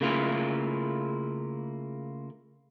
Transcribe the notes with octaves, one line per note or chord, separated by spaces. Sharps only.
C#3 A3 A#3 E4 F4